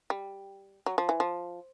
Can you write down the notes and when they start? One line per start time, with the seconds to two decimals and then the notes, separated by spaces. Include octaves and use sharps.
0.10 G3
0.86 F#3
0.98 F3
1.09 E3
1.20 F3